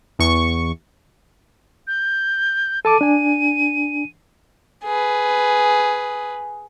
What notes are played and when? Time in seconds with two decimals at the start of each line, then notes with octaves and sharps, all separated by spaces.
0.19 E2 C#6
1.87 G6
2.85 A4 A5 D6 D#7
3.01 D4 G#5
4.85 G#4 B4